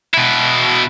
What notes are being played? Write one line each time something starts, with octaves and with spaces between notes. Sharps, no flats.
B2 E4